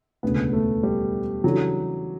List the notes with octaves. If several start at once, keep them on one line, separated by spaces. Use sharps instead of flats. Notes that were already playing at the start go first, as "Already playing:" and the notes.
E1 D2 C#3 B3
A3
G3
C#3 E3 F#3 G3 D4 A4